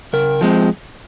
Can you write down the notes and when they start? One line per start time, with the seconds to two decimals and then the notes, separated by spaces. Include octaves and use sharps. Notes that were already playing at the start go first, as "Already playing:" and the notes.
0.13 C#3 A#4
0.41 F3 G#3 C4